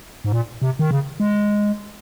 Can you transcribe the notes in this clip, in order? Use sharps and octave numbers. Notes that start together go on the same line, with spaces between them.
G#2
A#2
C3
D#3
C#3
G#3